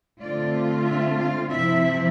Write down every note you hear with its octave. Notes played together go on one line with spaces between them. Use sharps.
D3 A3 C4 F4 D5
E5
F5
C3 F3 C4 E4 E5